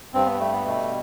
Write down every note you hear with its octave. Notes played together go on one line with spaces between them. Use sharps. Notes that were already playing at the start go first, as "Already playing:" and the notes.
G2 C4
B3
G3 A3
B3
B2 A3